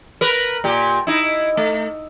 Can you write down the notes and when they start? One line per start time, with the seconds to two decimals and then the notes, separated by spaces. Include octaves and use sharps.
0.21 A#4 B4
0.64 A#2 G4
1.07 D#4 E4
1.57 A3